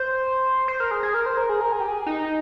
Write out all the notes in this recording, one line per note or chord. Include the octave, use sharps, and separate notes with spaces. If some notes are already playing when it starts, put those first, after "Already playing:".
Already playing: C5
C5
A#4
G#4
G#4
A#4
C5
A#4
G#4
A#4
G#4
G4
G#4
D#4